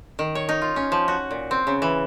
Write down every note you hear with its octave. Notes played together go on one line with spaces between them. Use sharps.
D#3
C#5
D#4
F4
C#4
F3
F#4
A#2
C4
C#3
E3